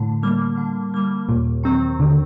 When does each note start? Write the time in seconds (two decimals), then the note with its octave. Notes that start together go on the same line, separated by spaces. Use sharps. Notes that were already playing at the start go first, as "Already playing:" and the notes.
Already playing: A2 D3
0.23 G3 A#3
0.57 D3
0.94 G3 A#3
1.29 D#2 A#2
1.63 D#3 F#3 C4
2.00 D#2 D3